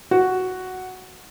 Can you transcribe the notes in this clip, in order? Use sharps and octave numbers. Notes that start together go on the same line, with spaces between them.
F#4